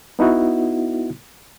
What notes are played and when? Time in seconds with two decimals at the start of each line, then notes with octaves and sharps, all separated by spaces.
0.19 B3 D#4 E4 F#4